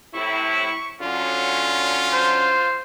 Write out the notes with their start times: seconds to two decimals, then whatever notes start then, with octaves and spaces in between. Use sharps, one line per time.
0.14 A2 C3 E4 C#6
1.02 D3 F#3 C#4 F4
2.13 C5